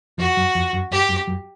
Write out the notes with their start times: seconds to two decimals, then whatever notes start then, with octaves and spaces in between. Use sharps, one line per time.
0.18 F2 F3 F#4
0.37 F#2 F#3
0.55 F2 F3
0.73 F#2 F#3
0.91 G2 G3 G4
1.09 F#2 F#3
1.27 F#2 F#3